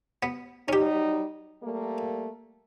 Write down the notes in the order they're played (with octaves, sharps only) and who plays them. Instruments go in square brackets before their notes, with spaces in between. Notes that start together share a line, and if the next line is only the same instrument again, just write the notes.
[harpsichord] B3
[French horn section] F#3 G3 D#4 [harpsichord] C#4 G4
[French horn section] G3 A3 A#3